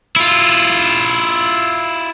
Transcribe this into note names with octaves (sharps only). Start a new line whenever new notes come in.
E4 F4